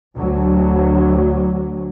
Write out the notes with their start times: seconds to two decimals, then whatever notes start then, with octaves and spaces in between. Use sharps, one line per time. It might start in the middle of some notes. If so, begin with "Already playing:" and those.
0.17 D2 F#3